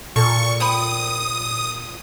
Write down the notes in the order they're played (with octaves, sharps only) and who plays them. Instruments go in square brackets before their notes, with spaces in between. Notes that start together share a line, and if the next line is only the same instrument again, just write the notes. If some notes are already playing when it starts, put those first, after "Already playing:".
[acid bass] A#2 [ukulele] A4 [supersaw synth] C#6
[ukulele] C5 G5 B5 [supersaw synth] D#6